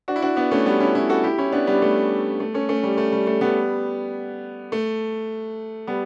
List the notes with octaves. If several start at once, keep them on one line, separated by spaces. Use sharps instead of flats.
D4 F#4
E4
D4 F#4
B3 D4
A3 C#4
G3 B3
C#4 E4
C#4 E4
F#4 A4
E4 G4
C#4 E4
B3 D4
G3 B3
A3
A3
A3 C#4
A3 C#4
G3
A3
G3
A3
G3 B3
A3
G3 B3